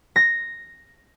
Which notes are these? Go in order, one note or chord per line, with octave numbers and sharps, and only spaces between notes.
A#6